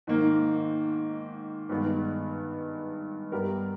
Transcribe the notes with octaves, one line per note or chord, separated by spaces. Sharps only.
G#2 D#3 A#3
G2 D#3 G#3 B3
G2 G3 B3 G4 A#4